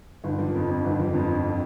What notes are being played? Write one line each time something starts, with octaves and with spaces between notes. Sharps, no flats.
G1
F3
F2
C4
G1
F3
F2
C4